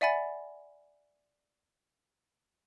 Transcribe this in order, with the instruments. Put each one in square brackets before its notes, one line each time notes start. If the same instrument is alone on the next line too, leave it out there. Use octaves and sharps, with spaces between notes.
[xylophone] D5 E5 F#5 G#5 B5 A6